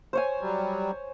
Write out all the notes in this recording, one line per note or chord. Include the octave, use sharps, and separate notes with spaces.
C5 C#5 G#5
F#3 G3